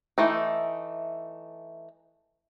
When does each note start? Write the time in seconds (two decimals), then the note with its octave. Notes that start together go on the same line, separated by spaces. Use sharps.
0.18 E3 A3 D#4